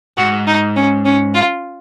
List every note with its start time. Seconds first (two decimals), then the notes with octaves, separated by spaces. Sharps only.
0.17 G#2 F#4
0.47 D#4
0.76 C#4
1.05 C#4
1.34 F4